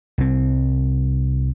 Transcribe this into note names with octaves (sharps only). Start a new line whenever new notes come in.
C2 C4